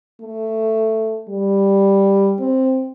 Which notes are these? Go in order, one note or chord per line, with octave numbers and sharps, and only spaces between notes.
A3
G3
C4